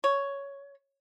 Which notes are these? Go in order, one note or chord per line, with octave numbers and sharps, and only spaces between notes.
C#5